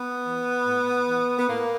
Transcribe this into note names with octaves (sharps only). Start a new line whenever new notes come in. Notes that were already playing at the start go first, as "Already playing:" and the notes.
Already playing: B3
E3
A2
E3
B3
A2 A#3